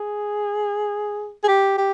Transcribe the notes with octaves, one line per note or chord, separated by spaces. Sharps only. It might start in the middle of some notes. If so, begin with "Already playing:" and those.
Already playing: G#4
G#4
G4
G4